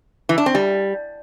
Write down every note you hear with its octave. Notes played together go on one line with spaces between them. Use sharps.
E3
D4
C4
G3